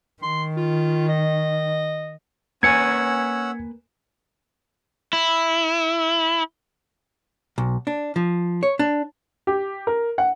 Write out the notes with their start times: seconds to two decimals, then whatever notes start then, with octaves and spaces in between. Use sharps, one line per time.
0.22 D#3 C6
0.57 F4
1.09 D#5
2.63 A#3 C#4 B4 F#5 G#5 E6 G#6 C#7
5.13 E4
7.58 B1
7.87 D4
8.16 F3
8.63 C#5
8.79 D4
9.47 G4
9.87 A#4
10.18 F#5